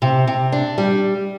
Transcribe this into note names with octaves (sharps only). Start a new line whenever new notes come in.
C3
C3
D4
G3